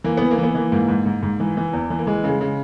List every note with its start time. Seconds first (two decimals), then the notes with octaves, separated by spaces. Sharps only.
0.04 E3 A#3
0.17 E3 B3
0.31 A#3
0.38 E3
0.43 B3
0.55 E3 A#3
0.72 G#2 A#3
0.88 G#2
1.06 G#2
1.22 G#2
1.40 E3
1.57 E3
1.73 E2
1.90 E3
1.99 A#3
2.07 E3 G#3
2.24 C#3
2.29 G#3
2.41 C#3